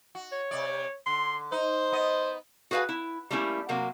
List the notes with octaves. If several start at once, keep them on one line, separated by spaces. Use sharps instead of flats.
F#4
C#5
C3 D5
D3 C6
D#4 C5
B3 D#5
F#4 G#4 B4 F5 G#5
E4
G3 A3 A#3 C#4 E4
C3 F#3 A#3